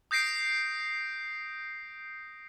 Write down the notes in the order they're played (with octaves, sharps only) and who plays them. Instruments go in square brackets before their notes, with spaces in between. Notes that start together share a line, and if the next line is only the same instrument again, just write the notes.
[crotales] D#6 G6 A#6 C7 D7